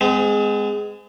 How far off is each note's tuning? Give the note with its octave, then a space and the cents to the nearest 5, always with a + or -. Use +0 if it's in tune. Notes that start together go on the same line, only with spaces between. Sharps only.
G#3 +0 C4 -45